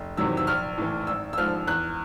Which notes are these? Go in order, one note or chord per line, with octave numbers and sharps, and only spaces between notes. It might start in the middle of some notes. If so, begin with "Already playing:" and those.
Already playing: F1
E2 C3 D#3 F#3 E6
E6
A#1 F6
A2 E3
G#1 E6
E6
G#2 F3 F6
E2 F#6